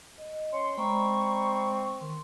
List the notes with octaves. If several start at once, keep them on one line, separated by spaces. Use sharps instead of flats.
D#5
C#4 C6 C#7
G#3 C4 D5 A#5 B5 C#6
D#3 C6